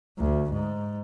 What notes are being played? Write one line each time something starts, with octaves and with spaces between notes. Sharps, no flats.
D2
G#2